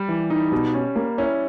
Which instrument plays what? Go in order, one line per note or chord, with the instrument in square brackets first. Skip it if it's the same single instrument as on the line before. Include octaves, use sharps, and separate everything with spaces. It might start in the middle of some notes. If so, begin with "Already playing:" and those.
Already playing: [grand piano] G3
[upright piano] E3
D#4
B2
C#4
A#3
[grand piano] C#4 [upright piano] E4